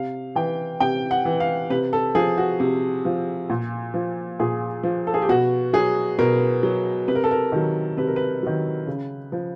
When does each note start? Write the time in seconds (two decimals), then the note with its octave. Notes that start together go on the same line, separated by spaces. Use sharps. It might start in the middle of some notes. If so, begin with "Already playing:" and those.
Already playing: C3 F5
0.36 E3 G5
0.80 C3 G5
1.11 F#5
1.25 E3
1.40 F5
1.70 C3 B4
1.93 A4
2.15 F3 G#4
2.38 F#4
2.60 C3
3.05 F3
3.50 A#2
3.94 F3
4.40 A#2 G#4
4.83 F3
5.07 A4
5.14 G#4
5.22 G4
5.29 B2 F#4
5.73 F#3 G#4
6.19 B2 A#4
6.63 F#3
7.08 C3 B4
7.15 A#4
7.24 A4
7.31 A#4
7.52 D#3 F#3
7.97 C3 B4
8.07 A#4
8.16 B4
8.43 D#3 F#3
8.87 C#3
9.32 F3